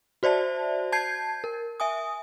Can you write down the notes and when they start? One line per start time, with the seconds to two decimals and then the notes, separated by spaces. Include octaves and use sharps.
0.23 F#4 C5 D5 E5 A5
0.92 A5 G6 G#6 C7
1.44 A#4
1.80 E5 G#5 D#6